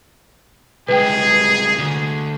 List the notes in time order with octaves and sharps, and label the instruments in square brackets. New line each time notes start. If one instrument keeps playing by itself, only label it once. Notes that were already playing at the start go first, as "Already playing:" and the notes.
[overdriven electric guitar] C2 G#3 [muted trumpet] G#4 [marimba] B4 G5
[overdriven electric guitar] D2 D3